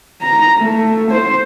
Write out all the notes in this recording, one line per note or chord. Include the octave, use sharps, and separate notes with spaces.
A#5
A3
C5